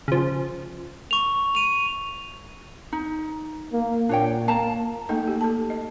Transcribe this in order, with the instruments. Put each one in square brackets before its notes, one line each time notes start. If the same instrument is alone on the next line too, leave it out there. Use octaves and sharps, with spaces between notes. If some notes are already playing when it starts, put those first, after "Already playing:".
[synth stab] C#3 F3
[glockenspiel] C#6 F7
D#7 F7
[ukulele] D#4
[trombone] A#3
[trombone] A#2 [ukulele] D4 C#5 G5
[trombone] A#3 [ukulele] F5 A5 A#5
[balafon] A3 A#3 D#4 A4 D#5
A#3 G4
A4 A5
D#5